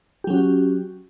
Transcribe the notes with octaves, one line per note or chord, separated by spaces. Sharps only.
F#3 C#4 F#4 G4